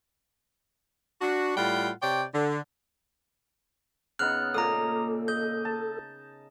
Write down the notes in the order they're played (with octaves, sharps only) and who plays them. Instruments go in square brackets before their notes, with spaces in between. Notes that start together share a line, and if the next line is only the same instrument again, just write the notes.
[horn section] D4 F#4
A2 G3 F4 F#5 G5
C3 C#5 D5 G5
D3
[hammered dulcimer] C#3 B3 D#4 [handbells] F6 F#6
[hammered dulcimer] A#2 A#3 [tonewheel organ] A4 [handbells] A#5 D#6
[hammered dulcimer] D#5 [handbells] G6
[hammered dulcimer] A5